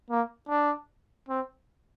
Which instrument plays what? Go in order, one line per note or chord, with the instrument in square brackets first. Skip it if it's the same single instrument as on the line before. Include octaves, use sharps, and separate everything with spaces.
[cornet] A#3
D4
C4